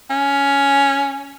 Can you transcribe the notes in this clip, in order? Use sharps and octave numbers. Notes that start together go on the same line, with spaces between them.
C#4